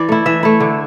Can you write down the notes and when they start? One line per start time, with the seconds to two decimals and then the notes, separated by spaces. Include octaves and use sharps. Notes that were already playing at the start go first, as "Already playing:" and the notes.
Already playing: E3 D5
0.09 A3 E4
0.26 E3 E5
0.43 A3 E4
0.60 D3